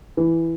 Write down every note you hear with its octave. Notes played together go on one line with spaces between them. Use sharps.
E3